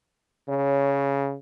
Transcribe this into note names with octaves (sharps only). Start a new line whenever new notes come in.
C#3 C#5